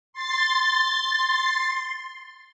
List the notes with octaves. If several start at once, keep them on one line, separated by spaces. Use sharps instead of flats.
C6 A6